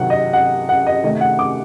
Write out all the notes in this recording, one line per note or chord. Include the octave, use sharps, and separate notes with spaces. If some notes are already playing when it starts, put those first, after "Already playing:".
Already playing: C3 D#3 F#3 F#5
D#5
F#5
F#5
D#5
C3 D#3 A3 D#5
F#5
D6